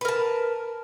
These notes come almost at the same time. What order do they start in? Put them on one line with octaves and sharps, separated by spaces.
B4 A#4 A5